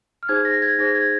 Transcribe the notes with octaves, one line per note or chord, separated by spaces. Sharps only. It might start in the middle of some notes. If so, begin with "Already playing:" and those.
F6
D#4 G#4 C5 G#6
A#6
G#6
D#4 G#4 C5 A#6
G#6